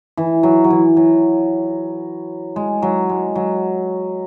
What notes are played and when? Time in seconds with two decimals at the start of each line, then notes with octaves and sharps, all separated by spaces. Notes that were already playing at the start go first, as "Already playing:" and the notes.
0.17 E3
0.43 F#3
0.64 F#3
0.70 E3
0.97 F#3
2.56 G#3
2.82 F#3
3.10 G#3
3.35 F#3